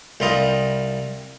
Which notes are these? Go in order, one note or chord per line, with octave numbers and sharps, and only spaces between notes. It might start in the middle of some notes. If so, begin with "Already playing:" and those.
C2 G3 F4 D#5